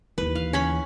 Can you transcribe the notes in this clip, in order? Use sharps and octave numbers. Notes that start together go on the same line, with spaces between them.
D#2 E3 B4
F5
C#4 C#5 B5